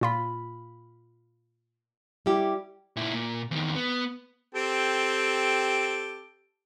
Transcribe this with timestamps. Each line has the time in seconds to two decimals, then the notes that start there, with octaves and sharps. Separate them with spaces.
0.01 A#2 F4 B5
2.26 G3 E4 G4
2.96 A#2 E4
3.14 A#2
3.51 E2 D#3
3.76 B3
4.55 C4 G4 A4